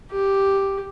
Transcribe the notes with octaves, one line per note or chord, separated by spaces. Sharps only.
G4